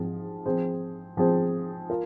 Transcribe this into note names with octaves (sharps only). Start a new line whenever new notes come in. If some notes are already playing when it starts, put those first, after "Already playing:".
Already playing: G#2 F3 C4 G#4
F3 C4 G#4 C5
F3 C4 G#4 C5
F4 A#4